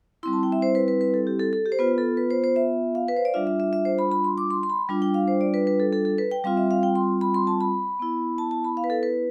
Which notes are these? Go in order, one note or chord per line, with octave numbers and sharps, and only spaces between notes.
G3 C4 E4 C6
A5
G5
E5
C5
B4
B4
B4
A4
G4
A4
A4
G4
C5
B3 F4 B4
A4
B4
C5
C5
E5
F5
B4
C5
D5
G3 D4 F4 E5
E5
E5
E5
C5
B5
B5
C6
D6
C6
C6
B5
G3 D4 F4
G5
F5
C5
D5
B4
B4
A4
A4
A4
B4
G5
G3 C4 F4 F5
E5
F5
G5
C6
B5
C6
A5
B5
B3 E4
A5
A5
B5
F5
B4
A4
B4